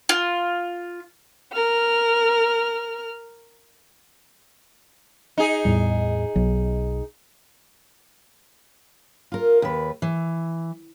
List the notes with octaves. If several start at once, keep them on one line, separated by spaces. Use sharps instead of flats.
F4
A#4 F6
D#4 G#4
E2 A2 G3
B1 F#3
F4 A#4
D#2 B4
E3